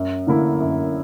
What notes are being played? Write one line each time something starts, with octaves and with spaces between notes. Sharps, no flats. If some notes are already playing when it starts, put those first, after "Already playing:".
Already playing: F#2
D3 A#3 E4
F#2